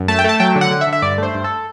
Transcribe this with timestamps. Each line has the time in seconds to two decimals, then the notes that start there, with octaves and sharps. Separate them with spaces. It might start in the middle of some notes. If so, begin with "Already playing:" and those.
Already playing: F#2
0.08 A3 A5
0.19 G5
0.24 A3 A5
0.40 F#3 G5
0.56 D3
0.61 F#5
0.71 D3
0.81 E5
0.87 D3
0.93 E5
1.02 G2 D5
1.18 A3 C5
1.34 G2
1.44 A4